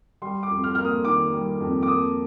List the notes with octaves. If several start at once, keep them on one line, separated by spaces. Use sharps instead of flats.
G3 C6
D6
F2
F6
A#3 F6
D#6
D#3 D6
G3
F2
D6
A#3 D#6